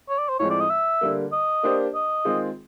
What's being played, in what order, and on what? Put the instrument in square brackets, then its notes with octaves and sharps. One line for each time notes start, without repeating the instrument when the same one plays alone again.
[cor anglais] C#5
D5
C5
[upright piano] A2 F3 G#3 C4 [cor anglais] C#5
[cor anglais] D5
D#5
E5
[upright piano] D3 G3 A#3
[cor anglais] D#5
[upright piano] A#3 D4 G4 C5
[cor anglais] D#5
[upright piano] D#3 G#3 C4 F4 G#4